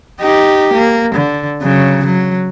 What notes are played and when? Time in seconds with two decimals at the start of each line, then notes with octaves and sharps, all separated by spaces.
0.21 D#4 G4
0.73 A#3
1.15 D3
1.62 C#3 F#3
2.06 F#3